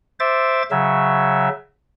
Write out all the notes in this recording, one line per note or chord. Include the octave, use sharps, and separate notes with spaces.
C5 E5 D6 A6
C#3 F#3 E5